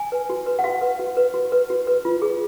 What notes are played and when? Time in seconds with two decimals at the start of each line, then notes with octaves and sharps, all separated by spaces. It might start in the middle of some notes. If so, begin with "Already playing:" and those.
Already playing: G#5
0.12 B4
0.30 F#4
0.46 B4
0.59 F#5
0.64 F#4 F5
0.81 B4
0.99 F#4
1.17 B4
1.34 F#4
1.52 B4
1.70 F#4
1.87 B4
2.05 F4
2.22 G#4